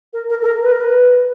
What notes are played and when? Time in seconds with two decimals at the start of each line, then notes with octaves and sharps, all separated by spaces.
0.13 A#4
0.30 A#4
0.42 A4
0.46 A#4
0.62 B4
0.72 A#4
0.81 B4